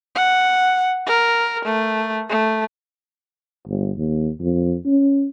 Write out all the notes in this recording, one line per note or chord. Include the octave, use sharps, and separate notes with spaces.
F#5
A#4
A3
A3
G1
D#2
F2
C#4